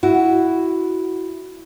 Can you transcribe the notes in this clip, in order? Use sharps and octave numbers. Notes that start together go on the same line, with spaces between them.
E4 F#4